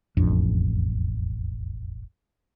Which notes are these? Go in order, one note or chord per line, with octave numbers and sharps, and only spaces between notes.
E1 A1 F2 D4